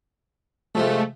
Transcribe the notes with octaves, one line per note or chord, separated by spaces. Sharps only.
C3 F3 G#3 A3